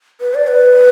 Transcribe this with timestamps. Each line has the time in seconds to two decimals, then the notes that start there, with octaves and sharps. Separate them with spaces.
0.21 B4
0.35 D5
0.47 B4